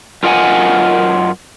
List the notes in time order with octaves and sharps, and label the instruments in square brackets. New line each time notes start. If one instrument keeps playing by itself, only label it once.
[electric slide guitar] F#2 F4 A#4 D#5 F#5 G#5